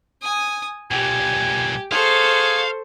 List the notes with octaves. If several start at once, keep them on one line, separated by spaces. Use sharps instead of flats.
G#5 D#6
B1 A#2 G4 G#5
G#4 A4 C5 F5 C#6